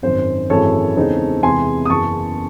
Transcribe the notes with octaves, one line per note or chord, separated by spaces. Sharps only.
G#1 F#2 D#3 C5
G#1 F#2 E3 G#3 A4 C#5
E2 C#3 G#3 C4 D#4
E2 C3 E3 G#3 G#5 C6
D#6
F#1 E2 C#3 A5 C#6